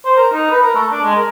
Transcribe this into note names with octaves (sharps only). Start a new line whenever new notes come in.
C5
A#4
D#4
B4
A#4
A3
D4
G#3
A#4